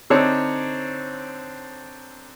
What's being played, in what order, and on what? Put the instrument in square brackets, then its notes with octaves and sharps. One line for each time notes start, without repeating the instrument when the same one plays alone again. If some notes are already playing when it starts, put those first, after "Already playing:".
[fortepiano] D3 C4 D4 D#4 C#5